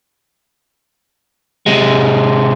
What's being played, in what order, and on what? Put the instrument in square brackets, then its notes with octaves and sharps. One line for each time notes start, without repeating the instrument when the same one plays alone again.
[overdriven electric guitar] C3 G#3